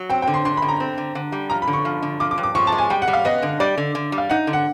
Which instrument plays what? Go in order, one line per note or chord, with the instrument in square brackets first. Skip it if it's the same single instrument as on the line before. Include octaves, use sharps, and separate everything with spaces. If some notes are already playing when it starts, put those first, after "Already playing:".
Already playing: [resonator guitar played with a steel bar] F#3
[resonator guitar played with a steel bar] C4 [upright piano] G5
[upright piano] G5
[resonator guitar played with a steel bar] D3
[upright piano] C6
[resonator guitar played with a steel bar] D3 [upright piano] C6
[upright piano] B5
[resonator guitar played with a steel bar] D3
[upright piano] A#5
[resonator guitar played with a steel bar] C4
D3
D3
G3
[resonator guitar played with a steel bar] F3 [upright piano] A#5
[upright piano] B5
[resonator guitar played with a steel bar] D3
[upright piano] C#6
[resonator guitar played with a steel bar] F3
D3
[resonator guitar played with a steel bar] F3 [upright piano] D6
[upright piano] D6
[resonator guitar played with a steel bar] G2
[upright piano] D6
[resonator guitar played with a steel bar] F3 [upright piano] C#6
[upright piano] A5
[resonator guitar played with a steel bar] G#3
[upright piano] G#5
[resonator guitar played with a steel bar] G3 [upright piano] G5
[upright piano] F#5
[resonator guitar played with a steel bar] G3
[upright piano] F5
[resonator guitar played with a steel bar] B3 [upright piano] D#5
[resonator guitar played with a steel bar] D3
[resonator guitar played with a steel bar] G3 [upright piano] D5
[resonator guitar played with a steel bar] D3
D3
G3
[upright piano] F5
[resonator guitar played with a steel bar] D#4 [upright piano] F#5
[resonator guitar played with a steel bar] D3
[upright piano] F#5